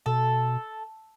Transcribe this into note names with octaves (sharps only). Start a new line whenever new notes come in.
B2 A4